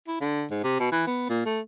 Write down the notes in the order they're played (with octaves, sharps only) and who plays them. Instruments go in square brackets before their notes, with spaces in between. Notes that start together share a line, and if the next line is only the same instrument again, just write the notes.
[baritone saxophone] E4
D3
G#2
C3
B2
E3
B3
A#2
A3